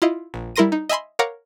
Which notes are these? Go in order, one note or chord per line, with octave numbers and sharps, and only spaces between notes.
E4 F4 D#5
A#1
G3 E4 A#4 C6 A#6 D#7
D#4
D#5 E5 G#5 B5 C6
A#4 C#5 F5 F#5 A#5 D6